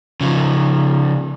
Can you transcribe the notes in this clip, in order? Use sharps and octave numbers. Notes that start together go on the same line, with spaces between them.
C#3 F3